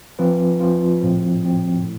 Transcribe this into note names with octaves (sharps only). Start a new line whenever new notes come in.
F3 C4 F4 B4
F3 C4 F4 B4
A2 F3 C4
A2 F3 C4
A2